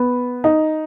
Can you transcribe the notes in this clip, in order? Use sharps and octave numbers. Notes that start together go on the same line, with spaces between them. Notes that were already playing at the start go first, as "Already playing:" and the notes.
Already playing: B3
D#4